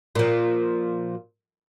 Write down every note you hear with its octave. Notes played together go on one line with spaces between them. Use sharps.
A#2 F3